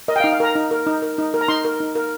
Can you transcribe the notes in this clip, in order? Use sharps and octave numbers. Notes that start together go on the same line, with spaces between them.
A#4 D#5
G5
F5
D#4
F5
A#4 A#5
D#4
A#4
D#4
A#4
D#4
A#4
A#5
D#4 C6
A#4
D#4
A#4